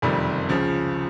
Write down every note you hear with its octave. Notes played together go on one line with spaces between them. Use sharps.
F#1 F2 C3 D#3 G3
C#2 C#3 F3